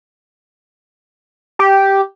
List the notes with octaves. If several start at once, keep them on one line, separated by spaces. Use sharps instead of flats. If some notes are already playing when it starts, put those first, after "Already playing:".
G4